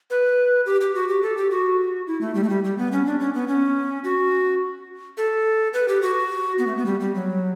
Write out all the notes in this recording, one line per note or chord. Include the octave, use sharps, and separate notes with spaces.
B4
G4
G4
F#4
G4
A4
G4
F#4
E4
A3
G3
A3
G3
G3
B3
C#4
D4
C#4
B3
C#4
F#4
A4
B4
G4
F#4
B3
A3
B3
G3
G3
F#3